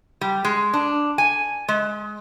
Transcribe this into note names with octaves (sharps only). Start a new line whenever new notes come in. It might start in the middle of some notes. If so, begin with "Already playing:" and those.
G3
G#3
D4
G#5
G#3